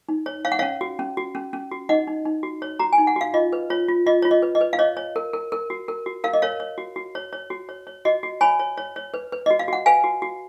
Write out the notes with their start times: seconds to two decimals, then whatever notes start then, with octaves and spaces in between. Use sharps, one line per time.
0.09 D#4
0.26 C#5
0.45 C#5 F5
0.52 F#5
0.59 C#4 C#5 F5
0.81 F#4
0.99 C#4
1.17 F#4
1.35 C#4
1.53 C#4
1.71 F#4
1.89 D#4 D#5 F#5
2.08 D#4
2.25 D#4
2.43 F#4
2.62 C#5
2.79 F#4 A#5
2.93 G#5
2.98 D#4
3.07 F#5
3.16 F#4 F5
3.34 F4 D#5
3.53 B4
3.70 F4 C#5
3.89 F4
4.06 F4 D#5
4.22 F4 C#5
4.31 D#5
4.42 B4
4.55 D#5
4.61 B4
4.73 F5
4.79 C#5 D#5
4.97 C#5
5.16 A#4
5.33 A#4
5.52 A#4
5.70 F#4
5.88 A#4
6.06 F#4
6.24 A#4 F5
6.33 D#5
6.42 A#4 C#5 F5
6.60 C#5
6.78 F#4
6.96 F#4
7.15 C#5
7.33 C#5
7.50 F#4
7.69 C#5
7.87 C#5
8.05 F#4 D#5
8.23 F#4
8.41 C#5 G#5 B5
8.59 C#5
8.77 C#5
8.96 C#5
9.14 B4
9.32 B4
9.46 F#4 D#5
9.59 F5
9.68 F#4 F#5
9.86 B4 F5 G#5
10.04 F#4
10.22 F#4